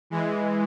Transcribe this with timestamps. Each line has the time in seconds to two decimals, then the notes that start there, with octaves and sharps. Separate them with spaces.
0.10 E3 G#3